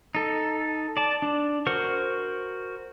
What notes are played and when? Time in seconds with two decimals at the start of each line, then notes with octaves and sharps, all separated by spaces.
0.15 D#4 A4
0.97 D5 A5
1.22 D4
1.67 F#4 A#4 C5 C#6